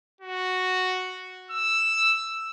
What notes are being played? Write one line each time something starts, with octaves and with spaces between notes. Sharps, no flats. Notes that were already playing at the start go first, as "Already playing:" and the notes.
F#4
E6